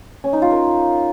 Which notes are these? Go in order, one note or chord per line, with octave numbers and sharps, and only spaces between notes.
C#4
D#4
F4
A#4